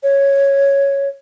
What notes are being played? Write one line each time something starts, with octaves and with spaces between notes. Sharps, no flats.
C#5